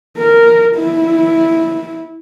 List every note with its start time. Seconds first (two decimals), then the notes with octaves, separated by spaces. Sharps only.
0.18 A#4
0.76 E4